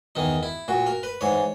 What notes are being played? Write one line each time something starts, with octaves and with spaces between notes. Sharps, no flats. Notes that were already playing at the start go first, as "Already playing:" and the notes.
E2 D#3 D#4
E4
A#2 F#4
A#4
B4
G#2 E3 C#5